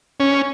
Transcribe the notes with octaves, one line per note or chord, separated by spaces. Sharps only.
C#4